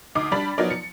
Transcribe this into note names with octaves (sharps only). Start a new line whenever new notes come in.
D2 D#4 D6 D#6 C7
G3 D4 D5 B5 A6
F3 F#3 B3 D#4 A#4 D5
C#7